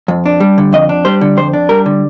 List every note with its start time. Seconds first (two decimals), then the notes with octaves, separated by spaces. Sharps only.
0.08 F2
0.26 D4
0.40 G3
0.58 D3
0.73 F2 D#5
0.89 D4
1.05 G3 C5
1.21 D3
1.37 F2 C5
1.53 D4
1.69 G3 A#4
1.86 D3